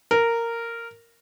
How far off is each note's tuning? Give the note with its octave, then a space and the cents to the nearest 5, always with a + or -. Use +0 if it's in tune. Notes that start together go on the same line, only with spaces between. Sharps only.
A#4 -10